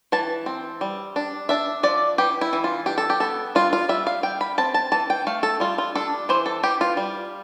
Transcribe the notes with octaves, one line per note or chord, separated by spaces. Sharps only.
E3 A5
C4
G3
D4
D4 E5
F3 D5
E3 G4
E4
E3
F4
D4 G4
A4
G4
B3 A4
G3 F4
F4
G3 E5
F5
G3 G5
B5
C4 A5
A5
E3 A5
G5
A3 F5
A4
G3 F4
F4
D4 A4
E3 C5
A4
E3 G4
F4
G3